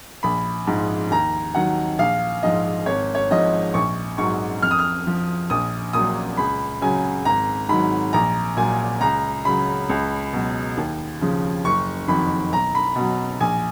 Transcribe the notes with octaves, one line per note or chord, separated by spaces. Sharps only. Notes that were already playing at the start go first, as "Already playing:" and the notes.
A#1 B5
G#2 F3
D#2 A#5
D#3 F#3 F#5
A#1 F5
G#2 F3 D#5
G#1 C#5
C#5
G#2 F3 D#5
A#1 C#6
G#2 F#3 C#6
F2 F6
D#6
F6
F3
A#1 D#6
A#2 F#3 D#6
C#2 B5
C#3 F#3 G#5
G#1 A#5
G#2 D#3 F#3 B5
A#1 A#5
A#2 F#3 G#5
C#2 A#5
C#3 F#3 B5
C#2
B2 F#3
D#2
C#3 F3
F#1 C#6
F2 D#3 F#3 B5
B1 A#5
B5
B2 F#3
A#1 G#5